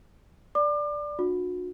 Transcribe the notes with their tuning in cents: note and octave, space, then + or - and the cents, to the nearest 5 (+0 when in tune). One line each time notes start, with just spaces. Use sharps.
D5 +0 D6 +35
D4 +15 F#4 -40